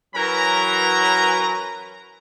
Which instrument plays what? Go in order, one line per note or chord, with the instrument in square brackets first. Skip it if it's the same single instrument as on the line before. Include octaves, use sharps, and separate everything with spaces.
[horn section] E3 F#3 C#4 A#4 B4 A#5